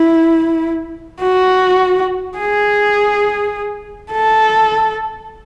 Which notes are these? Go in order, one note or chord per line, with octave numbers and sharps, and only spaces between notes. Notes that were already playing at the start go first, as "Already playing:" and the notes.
Already playing: E4
F#4
G#4
A4